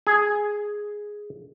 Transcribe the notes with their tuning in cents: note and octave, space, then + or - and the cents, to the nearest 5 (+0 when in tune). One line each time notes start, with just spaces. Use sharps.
G#4 +0 G#5 +20